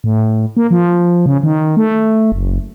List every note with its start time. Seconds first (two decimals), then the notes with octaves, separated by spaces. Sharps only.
0.04 A2
0.57 A#3
0.71 F3
1.26 C#3
1.43 D#3
1.77 A3
2.32 F#1